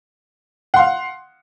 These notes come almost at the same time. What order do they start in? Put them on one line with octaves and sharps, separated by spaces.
F#5 C6 F5